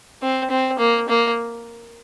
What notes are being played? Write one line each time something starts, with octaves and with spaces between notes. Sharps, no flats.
C4
C4
A#3
A#3